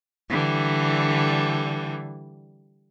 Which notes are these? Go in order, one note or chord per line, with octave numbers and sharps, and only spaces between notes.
D3 E3 G3